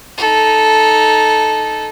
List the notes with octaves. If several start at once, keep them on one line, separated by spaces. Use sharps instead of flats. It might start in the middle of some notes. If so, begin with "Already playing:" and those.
D#4 A4